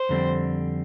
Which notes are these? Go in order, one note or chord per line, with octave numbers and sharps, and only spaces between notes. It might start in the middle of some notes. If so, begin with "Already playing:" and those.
Already playing: C5
F2 D3 G3 C4